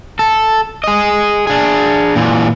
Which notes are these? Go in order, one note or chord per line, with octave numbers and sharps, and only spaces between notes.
A4
G#4 D#5
D4 G#4
A#2 E3